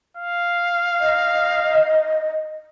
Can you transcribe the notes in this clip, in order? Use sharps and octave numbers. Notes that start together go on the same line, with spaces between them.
F5
D#5